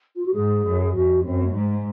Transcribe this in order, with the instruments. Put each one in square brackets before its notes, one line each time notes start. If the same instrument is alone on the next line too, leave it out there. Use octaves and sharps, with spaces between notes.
[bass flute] F4
F#4
[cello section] G#2 [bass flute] G#4
[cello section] F#2
[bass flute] G#4
[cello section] F2 [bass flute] F#4
[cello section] F#2 [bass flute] C4
[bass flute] A#3
[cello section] G#2 [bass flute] G#3
[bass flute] G#3